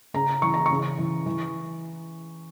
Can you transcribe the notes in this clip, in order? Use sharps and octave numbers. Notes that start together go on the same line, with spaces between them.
C#3 A#5
E3 C#6
A#5
C#3 C#6
E3
E3